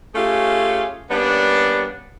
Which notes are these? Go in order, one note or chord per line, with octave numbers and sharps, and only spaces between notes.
A3 C#4 F4 G4 G#4
G3 A#3 B3 C#4 D4